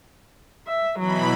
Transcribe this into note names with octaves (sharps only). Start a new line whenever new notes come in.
E5
B2 E3 F#3 B5